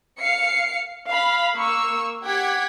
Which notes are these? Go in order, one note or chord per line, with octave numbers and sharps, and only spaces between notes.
F5 C7 C#7
F5 B5
A#3 C#6 E6
G4 F#5 G#6 B6